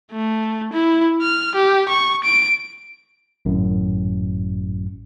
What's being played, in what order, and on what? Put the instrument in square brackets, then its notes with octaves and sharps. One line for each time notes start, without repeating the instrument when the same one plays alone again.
[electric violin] A3
E4
F6
G4
C#6
D7
[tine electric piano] G#1 F#2 A2